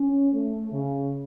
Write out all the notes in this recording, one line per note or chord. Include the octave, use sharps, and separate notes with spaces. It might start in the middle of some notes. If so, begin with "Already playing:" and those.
Already playing: C#4
A3
C#3